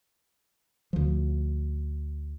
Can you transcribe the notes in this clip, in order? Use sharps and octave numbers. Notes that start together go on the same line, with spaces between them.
D2 F3